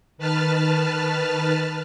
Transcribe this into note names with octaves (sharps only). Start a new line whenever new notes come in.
D#3 B4 A5 F6